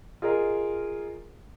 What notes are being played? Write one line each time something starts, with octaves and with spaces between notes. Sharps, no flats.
F4 G#4 A#4 D#5